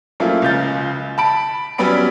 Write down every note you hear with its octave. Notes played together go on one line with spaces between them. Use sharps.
F3 F#3 A3 A#3 C#4 E4
C#2 C#3 G6 A6
A5 B5 D7
F#3 G3 B3 C#4 B5 D7